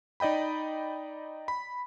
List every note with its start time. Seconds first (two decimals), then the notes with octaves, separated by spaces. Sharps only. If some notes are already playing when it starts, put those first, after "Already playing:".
0.20 D#4 D5 D#5 G5 B5
1.48 B5